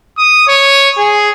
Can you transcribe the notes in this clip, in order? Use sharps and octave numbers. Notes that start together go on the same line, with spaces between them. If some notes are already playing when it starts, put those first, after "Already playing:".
D#6
C#5
G#4